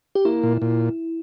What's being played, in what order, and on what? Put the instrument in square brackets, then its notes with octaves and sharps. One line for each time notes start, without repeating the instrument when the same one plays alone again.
[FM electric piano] G4
[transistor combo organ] A#3 [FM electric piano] E4
[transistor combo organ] A#2
A#2